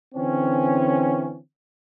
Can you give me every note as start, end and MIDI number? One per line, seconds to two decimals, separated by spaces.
0.15 1.38 50
0.15 1.38 52
0.15 1.38 60
0.15 1.38 61